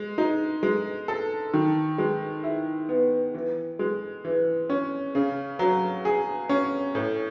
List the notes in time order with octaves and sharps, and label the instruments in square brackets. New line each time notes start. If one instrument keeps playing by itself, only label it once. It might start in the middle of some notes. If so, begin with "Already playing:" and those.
Already playing: [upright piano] G#3
D#4
G#3
A4
D#3
G#3
E4
B3
E3
G#3
E3
C#4
C#3
F#3
G#4
C#4
A2